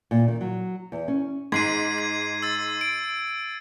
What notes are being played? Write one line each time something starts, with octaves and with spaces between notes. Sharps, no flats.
A#2
D#3
F#3
E2
C#4
G#2 G#6 C7 D#7
G#6
E6 A6
D7